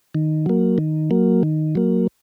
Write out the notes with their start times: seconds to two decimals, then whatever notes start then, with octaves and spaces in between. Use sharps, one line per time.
0.15 D#3
0.46 F#3 A#3
0.78 D#3
1.11 F#3 A#3
1.43 D#3
1.75 F#3 A#3